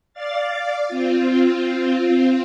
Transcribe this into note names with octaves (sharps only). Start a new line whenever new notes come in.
D5 F5 A6
C4 F4